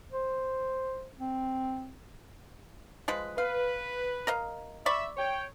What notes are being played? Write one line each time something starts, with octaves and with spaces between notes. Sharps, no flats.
C5
C4
F3 G#3 B4
B4 F5
A#4 D#5 F5
D5 E5 B5 C#6
C#5 G5